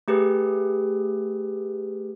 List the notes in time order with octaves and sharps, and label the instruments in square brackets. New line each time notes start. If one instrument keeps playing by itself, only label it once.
[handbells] A3 G4 G#4 B4